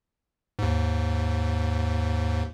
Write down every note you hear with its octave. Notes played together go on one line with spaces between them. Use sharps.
D#2 G#2